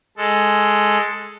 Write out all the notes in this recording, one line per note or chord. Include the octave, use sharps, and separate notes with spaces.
G#3 A4